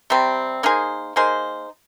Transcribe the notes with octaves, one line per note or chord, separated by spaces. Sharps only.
C3 G3 C4
A#3 D#4 G#4 C5
A#3 D#4 G#4 C5